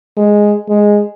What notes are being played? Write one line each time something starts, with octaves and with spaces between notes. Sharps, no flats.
G#3
G#3